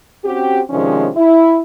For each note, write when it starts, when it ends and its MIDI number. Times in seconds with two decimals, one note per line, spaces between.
0.24 0.60 60
0.24 0.60 61
0.24 0.60 66
0.24 0.60 67
0.70 1.08 48
0.70 1.08 51
0.70 1.08 53
0.70 1.08 56
0.70 1.08 61
0.70 1.08 62
1.16 1.60 64